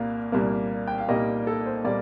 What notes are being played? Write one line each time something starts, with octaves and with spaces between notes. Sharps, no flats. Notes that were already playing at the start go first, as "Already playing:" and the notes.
Already playing: C2 A#2 G3 A#3 F5
C2 A#2 G3 A#3
G5
F5
C2 A#2 G3 A#3 D#5
A4
C5
A#2 G3 A#3 D5